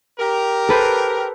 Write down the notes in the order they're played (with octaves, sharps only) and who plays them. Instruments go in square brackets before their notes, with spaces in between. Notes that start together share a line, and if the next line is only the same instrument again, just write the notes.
[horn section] G4 A#4
[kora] A4 B4 C5